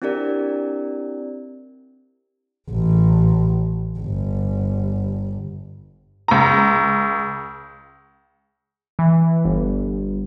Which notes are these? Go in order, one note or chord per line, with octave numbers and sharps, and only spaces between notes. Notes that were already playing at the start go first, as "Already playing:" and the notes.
C4 D4 E4 G4 A#4 D5
A1
G1
C#2 A#5
E3
G1